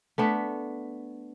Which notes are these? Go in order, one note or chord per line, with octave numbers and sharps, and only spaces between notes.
A3 B3 D4